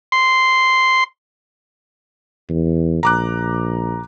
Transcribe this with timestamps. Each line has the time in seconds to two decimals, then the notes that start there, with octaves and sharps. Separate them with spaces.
0.12 C6
2.49 E2
3.03 A#1 A#5 D6 F#6